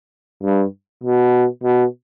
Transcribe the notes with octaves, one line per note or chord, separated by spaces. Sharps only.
G2
B2
B2